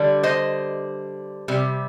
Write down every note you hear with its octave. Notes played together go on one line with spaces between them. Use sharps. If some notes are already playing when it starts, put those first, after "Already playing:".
Already playing: D3 G3
C5 D#5
C3 G3